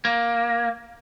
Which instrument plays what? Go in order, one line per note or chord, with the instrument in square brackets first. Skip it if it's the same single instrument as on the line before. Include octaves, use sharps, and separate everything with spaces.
[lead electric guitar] A#3